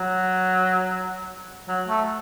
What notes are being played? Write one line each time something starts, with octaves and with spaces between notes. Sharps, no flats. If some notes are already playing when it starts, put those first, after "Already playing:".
Already playing: F#3
F#3
A3